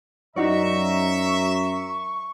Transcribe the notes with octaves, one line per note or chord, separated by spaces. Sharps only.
F#2 D#4 F#4 D5 E5 A#5 C#6